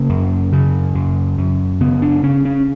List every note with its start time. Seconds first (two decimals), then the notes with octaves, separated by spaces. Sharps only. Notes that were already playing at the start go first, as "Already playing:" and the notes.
Already playing: C#3 A#3
0.10 F#2
0.53 C#3
0.95 F#2
1.38 F#2
1.81 C#3 B3
2.02 D4
2.23 C#3 C#4
2.45 C#4